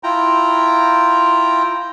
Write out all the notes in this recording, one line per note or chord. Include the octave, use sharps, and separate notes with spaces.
E4 F4 G5 A#5